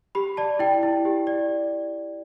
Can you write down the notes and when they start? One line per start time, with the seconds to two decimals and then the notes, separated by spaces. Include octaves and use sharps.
0.15 G4 B5
0.37 D5 A5
0.59 E4 G5
0.83 E4
1.05 G4
1.27 D5